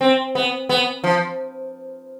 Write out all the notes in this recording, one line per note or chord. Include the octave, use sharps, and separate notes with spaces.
C4
B3
B3
F3